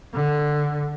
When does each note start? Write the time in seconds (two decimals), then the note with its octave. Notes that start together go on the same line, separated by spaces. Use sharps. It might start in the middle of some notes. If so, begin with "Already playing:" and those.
0.14 D3